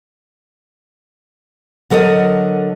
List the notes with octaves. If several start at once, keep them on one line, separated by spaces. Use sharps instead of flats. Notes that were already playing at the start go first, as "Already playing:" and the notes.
D3 F#3 A4 A#4 D#5